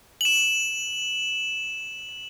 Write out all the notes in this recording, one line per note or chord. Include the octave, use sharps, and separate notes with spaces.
E7 F#7